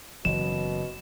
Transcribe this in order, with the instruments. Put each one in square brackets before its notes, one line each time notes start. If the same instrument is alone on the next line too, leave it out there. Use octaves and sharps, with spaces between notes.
[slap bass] F#1 E3 F#3 [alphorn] B2 [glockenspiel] E7